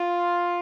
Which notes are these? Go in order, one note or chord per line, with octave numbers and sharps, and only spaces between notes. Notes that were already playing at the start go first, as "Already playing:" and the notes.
Already playing: F4